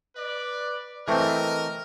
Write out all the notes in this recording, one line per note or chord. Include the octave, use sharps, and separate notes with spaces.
B4 D5
E3 A3 C4 A#4 D#5